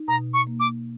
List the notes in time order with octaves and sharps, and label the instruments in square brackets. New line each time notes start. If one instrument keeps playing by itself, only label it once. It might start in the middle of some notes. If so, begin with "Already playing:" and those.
Already playing: [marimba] D#4
[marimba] B2 [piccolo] A#5
[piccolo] C#6
[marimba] A#3
[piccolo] D6